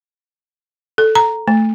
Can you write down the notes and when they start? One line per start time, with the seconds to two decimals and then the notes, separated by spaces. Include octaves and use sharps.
0.98 A4
1.15 A#5
1.48 A3